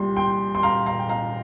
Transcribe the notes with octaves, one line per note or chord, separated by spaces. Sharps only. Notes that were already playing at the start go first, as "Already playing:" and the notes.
Already playing: C2 A#2 G3 C6
G5 C6
C6
F5 A#5
F5 A#5
G5
F5 A#5